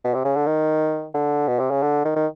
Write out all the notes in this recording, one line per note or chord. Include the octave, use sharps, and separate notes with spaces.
B2
C3
C#3
D3
D#3
D3
B2
C3
C#3
D3
D#3
D#3